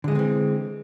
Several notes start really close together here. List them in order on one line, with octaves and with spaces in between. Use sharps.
D3 G#3 F3 C4 E3